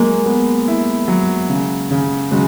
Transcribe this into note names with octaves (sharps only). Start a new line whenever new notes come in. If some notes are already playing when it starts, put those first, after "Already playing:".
Already playing: F#3 G#3 A#3
B3
E4
F#3
C#3
C#3
C#3 F#3 G#3